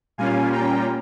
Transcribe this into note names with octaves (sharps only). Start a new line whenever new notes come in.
A#2 G3 A#3 C#4 F4 F5 G#5
G5 A#5